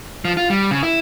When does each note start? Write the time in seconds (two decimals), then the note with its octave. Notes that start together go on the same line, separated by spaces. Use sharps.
0.25 F3
0.37 F4
0.50 G3
0.71 C#3
0.83 E4